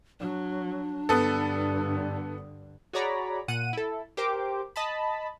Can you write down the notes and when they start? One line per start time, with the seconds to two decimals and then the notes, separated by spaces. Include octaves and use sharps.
0.20 F#3 D4
1.09 G2 D3 B3 A4
2.93 F#4 G#4 C#5 D5 A#5 B5
3.48 A#2 F#5 D#7
3.73 E4 A4
4.17 G4 A#4 C5 G5 D6
4.76 D#5 A5 B5